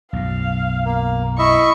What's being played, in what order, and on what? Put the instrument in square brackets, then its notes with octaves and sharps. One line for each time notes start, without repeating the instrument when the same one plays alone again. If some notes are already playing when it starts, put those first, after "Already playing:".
[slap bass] B1 F#2 [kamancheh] F5
[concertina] A#3
[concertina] E4 D#5 E5 [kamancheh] C#6